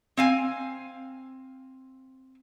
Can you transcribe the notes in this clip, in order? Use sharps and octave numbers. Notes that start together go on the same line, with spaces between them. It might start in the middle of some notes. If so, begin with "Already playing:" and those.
C4 F5 G#5